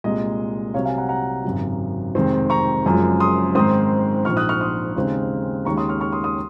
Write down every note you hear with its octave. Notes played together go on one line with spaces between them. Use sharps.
C2 A#2 G#3 D#5
C2 C3 F#3 C#5 F5
F5 G#5
F#5 A#5
F#5 A#5
G#1 F#2 C#3 F#3
F1 F2 D#3 G#3 C4
A#5 C#6
F#1 F#2 F3 G#3
C6 D#6
G#2 D#3 G#3 C4 C6 D#6
A#1 G#2 F3 C#6 F6
D#6 F#6
C#6 F6
C6 D#6
D#2 C#3 G#3 C4 D#4
D#2 D#3 G#3 C#4 A#5 C#6
C6 D#6
C#6 F6
C#6 F6
C6 D#6
C6 D#6